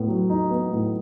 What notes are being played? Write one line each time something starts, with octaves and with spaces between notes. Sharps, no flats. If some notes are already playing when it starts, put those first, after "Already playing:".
Already playing: A2 B3
F#3
D#4
B3
A2